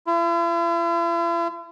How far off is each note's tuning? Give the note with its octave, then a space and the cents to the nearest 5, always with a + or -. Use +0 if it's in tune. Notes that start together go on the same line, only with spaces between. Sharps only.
E4 +45